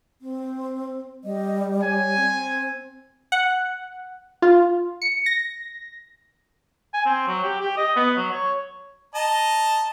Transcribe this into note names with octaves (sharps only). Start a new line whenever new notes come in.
C4
G3 D#5
C#5 G#5
C4
F#5
F4
C#7
A#6
G#5
C4
F#3
G4
G4
D#5
B3
F#3
C#5
D#5 A5 A#5